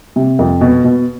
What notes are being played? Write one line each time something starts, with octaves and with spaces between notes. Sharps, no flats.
C3
F2
B2
B2